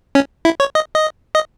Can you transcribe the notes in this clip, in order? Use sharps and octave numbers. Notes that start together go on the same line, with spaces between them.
C#4
E4
C#5
D#5
D#5
D#5